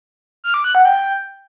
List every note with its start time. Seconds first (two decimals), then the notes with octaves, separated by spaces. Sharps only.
0.44 F6
0.54 D6
0.64 F#6
0.75 F#5
0.85 G5